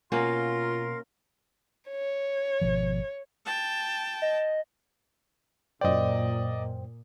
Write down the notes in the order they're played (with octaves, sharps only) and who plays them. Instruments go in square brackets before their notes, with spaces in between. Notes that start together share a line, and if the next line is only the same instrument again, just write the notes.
[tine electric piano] B2 [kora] A#3 C#4 F#4 [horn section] F4 [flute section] A#4 F5 C6
[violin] C#5
[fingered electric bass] G#1 B2 F3
[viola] G5 A5
[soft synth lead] D#5
[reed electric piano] F#2 C5 G5 [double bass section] A#2 [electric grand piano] D5 D#5